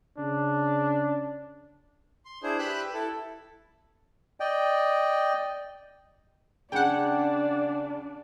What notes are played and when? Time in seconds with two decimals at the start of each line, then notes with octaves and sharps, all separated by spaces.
0.18 C#3 D4
2.25 C6
2.43 D4 E4 G#4 C5
2.59 G4 B4 G5 B5 E6 F#6
2.94 E4 A4
4.40 D5 D#5 G5
6.72 C#3 D4 F#5 G5